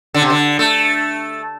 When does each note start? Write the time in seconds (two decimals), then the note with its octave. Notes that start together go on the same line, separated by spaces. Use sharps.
0.14 D3
0.22 C3
0.30 D3
0.59 A3